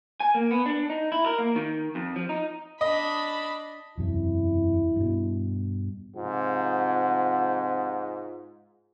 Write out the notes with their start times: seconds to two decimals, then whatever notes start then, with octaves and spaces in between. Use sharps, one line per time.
0.20 G#5
0.35 A#3
0.51 B3
0.66 D4
0.90 D#4
1.12 E4
1.26 A#4
1.38 A#3
1.56 D#3
1.95 F2
2.16 F3
2.29 D#4
2.81 D4 D#5 B5
3.98 E1 F#2 C3 E4
4.96 G2 B2
6.17 G#2 C3 F3 F4 F#5